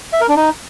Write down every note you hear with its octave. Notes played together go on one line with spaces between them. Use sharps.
E5
A#4
D4
D#4